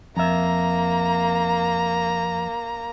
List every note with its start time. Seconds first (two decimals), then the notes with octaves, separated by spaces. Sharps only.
0.17 F2 A#3 E5 A#5